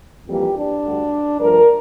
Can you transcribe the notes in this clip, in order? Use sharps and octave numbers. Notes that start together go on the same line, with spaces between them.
F2 E3 G3 A#3 G4
D4
D2 D3 G3
G2 F3 A3 A#4